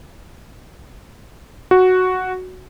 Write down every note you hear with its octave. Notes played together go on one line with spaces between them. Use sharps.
F#4